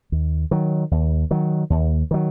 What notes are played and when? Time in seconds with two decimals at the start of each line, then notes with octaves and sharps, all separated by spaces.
0.12 D#2
0.51 D#3 F#3
0.91 D#2
1.31 D#3 F#3
1.70 D#2
2.11 D#3 F#3